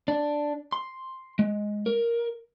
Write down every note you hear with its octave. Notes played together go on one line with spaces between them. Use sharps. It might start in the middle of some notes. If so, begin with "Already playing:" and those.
D4
C6
G#3
A#4